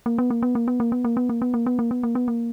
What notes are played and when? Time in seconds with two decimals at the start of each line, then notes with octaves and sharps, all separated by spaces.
0.06 A#3
0.18 B3
0.30 A#3
0.43 B3
0.55 A#3
0.68 B3
0.80 A#3
0.92 B3
1.04 A#3
1.17 B3
1.29 A#3
1.42 B3
1.54 A#3
1.66 B3
1.79 A#3
1.91 B3
2.03 A#3
2.15 B3
2.28 A#3